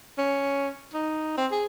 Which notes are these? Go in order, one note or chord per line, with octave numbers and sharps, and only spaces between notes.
C#4
D#4
C4
G#4